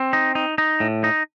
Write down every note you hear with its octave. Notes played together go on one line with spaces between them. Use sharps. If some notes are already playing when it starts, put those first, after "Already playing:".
Already playing: C4
D#4
D#4
D#4
A2
D#4